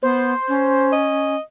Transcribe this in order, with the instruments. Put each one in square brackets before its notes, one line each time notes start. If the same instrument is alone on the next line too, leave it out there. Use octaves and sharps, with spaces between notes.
[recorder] B3 [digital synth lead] C5
[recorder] C#4
[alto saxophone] D#5